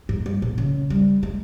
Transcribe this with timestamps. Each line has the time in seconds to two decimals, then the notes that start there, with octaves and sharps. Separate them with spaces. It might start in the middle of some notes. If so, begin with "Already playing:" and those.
0.09 G#2
0.26 G2
0.42 A#2
0.58 C#3
0.90 G3
1.23 G#3